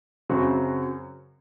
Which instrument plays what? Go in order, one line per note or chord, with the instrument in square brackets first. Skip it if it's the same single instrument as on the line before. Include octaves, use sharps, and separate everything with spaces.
[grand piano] F#2 C#3 F#3 C4 F#4